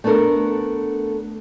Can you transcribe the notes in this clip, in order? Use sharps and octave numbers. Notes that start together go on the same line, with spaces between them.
A3 B3 D4 A4 A#4